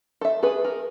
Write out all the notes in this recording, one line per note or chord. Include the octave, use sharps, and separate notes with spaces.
A4 E5
G#4 A4 B4
A#4